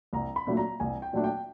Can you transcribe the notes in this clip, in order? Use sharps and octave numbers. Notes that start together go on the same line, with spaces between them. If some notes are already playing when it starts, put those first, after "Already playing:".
C2 A#5
B5
A#2 F#3 A3 D4
A#5
C2 G#5
G5
A#2 F#3 A3 D4
G5